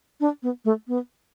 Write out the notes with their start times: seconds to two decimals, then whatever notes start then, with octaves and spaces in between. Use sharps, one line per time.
0.20 D4
0.43 B3
0.65 A3
0.88 B3